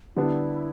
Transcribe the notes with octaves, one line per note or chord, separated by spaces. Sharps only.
D3 G3 B3 D4 E4